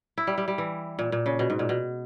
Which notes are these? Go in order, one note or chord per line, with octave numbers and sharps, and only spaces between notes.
E4
G3
G3
G3
E3
A#2
A#2
C#3
B2
G#2
A#2
B2